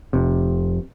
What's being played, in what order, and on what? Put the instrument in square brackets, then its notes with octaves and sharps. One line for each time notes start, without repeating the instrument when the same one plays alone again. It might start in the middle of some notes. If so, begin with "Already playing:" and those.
[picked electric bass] F1 C3